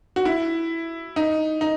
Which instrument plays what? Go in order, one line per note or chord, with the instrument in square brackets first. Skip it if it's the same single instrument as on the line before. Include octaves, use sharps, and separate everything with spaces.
[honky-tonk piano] F#4
E4
D#4
D#4